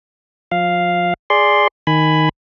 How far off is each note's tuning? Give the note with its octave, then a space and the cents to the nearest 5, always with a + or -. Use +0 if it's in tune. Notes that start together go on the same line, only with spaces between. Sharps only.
F3 +30 F5 +0
G#4 +0 D5 +0 C6 +0
D#3 +0 G#5 +0 B5 +10